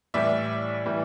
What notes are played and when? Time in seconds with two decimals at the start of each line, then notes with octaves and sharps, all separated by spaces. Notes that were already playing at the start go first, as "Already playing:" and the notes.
0.14 A2 E3 G3 D5 E5
0.85 A2 E3 G3